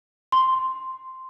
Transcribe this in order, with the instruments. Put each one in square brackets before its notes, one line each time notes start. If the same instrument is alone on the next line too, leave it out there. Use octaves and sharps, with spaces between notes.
[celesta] C6